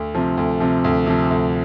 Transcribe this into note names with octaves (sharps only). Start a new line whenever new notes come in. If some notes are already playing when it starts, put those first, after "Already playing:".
Already playing: D2
C3 F3
D2
C3 F3
D2
C3 F3
D2